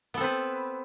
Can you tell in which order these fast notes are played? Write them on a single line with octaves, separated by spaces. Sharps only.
B3 A4 C4 B4